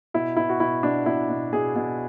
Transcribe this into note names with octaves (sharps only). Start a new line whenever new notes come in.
B2 E4
B2 E4
F#4
B2 E4
B2 D4
B2 E4
B2
B2 G#4
B2